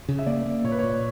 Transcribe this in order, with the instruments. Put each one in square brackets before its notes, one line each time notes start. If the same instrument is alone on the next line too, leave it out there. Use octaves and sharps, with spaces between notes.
[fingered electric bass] C#3
[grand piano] E5
[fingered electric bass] A#3 [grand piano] D5
[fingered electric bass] A#3
[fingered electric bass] A#2 [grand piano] C#5
[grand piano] B4
[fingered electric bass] A#2 [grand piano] C#5